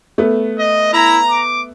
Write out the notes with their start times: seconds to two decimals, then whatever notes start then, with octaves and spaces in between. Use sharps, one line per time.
0.18 A3 B3
0.58 D#5
0.93 E4 A#5
1.30 D6